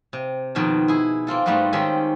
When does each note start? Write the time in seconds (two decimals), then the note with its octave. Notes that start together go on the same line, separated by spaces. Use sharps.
0.13 C3
0.55 F2 B2 D#3 A#4 A5
0.88 E4 G#4
1.27 A#3 C4 F4 A4
1.46 G#2 G3 A3 B3 F4 F#4
1.73 D#3 G#3 C4 C#4 G4 A4